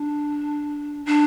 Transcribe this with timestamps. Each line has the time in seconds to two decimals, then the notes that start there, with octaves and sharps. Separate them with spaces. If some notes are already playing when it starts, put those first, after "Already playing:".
Already playing: D4
1.06 D4